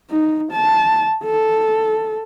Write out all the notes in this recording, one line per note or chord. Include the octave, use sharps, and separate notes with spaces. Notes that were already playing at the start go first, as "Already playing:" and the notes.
D#4
A5
A4